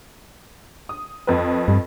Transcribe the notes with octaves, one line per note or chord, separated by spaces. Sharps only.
D#6
F2 B4
G2